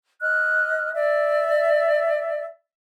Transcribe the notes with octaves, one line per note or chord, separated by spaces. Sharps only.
D#5 F6 F#6
D5 E5